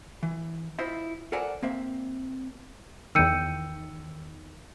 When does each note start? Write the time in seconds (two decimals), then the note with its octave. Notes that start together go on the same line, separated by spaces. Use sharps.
0.23 E3
0.79 E4 F4 C5 D#5 E5
1.32 A4 A#4 C5 D5 F#5 G#5
1.63 A#3 C4 E5
3.15 E2 D#3 G5 E6 G6 C#7 D#7